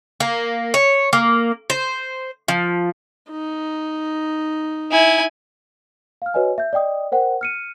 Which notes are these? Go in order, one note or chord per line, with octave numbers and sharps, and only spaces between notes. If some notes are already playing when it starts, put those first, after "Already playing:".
A#3
C#5
A#3
C5
F3
D#4
E4 G#5
F5 F6
F#4 B4 C#5 D#5 G#5
E5 G6
D5 D#5 G5 D#6
A#4 C5 F#5 G5
F6 C#7 D#7